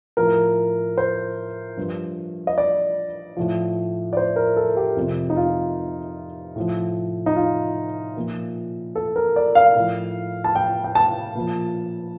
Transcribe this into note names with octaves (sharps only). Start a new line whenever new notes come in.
A2 F3 A#4
C5
G2 F3
D#5
D5
A2 F3
D5
C5
A#4
A4
G4
F2 C3 F3
D#4
F4
A2 F3
D#4
F4
A#2 F3
A4
A#4
D5
F5
A2 F3
A5
G5
G5
A5
A#2 F3